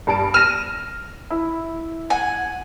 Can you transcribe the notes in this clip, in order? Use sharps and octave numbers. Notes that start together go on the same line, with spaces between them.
G2 A5 D7
F6 A#6 D#7 E7
E4
F#5 G#5